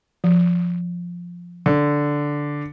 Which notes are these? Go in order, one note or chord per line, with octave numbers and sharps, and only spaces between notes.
F3
D3